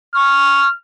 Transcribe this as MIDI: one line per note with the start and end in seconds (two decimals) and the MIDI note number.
0.15 0.68 85
0.15 0.73 89